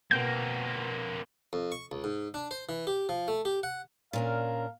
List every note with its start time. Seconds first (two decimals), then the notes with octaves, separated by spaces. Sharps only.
0.11 B2 A#3 C4 G6
1.53 F2
1.72 C#6
1.92 C#2
2.04 G#2
2.34 D4
2.51 C5
2.69 E3
2.87 G4
3.09 F3
3.28 A3
3.45 G4
3.63 F#5
4.13 A#2 C#4 D4 A#4 F5